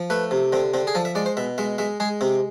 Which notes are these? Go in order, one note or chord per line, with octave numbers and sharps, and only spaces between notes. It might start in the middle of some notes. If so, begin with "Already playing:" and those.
Already playing: F3
A3 B4
C3
D3 C4
D3 C4
G#4
F3 A4
E5
G#3 D5
C5
B2 E5
G#3 E5
G#3 E5
G#3 G#4
C3 C4